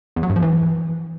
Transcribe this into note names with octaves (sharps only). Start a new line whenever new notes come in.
E2
F#3
G2
F3
E3